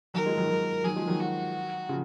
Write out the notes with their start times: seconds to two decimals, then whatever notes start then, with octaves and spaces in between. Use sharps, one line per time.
0.14 D#3 F#3 A#4
0.26 F3 G#3
0.37 D#3 F#3
0.49 D#3 F#3
0.84 D#3 F#3 G#4
0.96 F3 G#3
1.08 D#3 F#3
1.20 F#4
1.89 C#3 F3